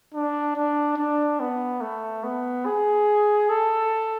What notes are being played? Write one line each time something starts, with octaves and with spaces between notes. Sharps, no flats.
D4
D4
D4
B3
A3
B3
G#4
A4